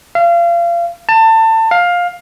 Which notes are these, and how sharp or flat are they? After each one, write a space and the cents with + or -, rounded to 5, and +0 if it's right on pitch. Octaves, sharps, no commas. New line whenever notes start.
F5 -30
A5 +25
F5 +15